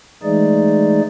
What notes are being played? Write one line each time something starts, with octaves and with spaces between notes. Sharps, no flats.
E3 G#3 A3 D#4 G#4 D5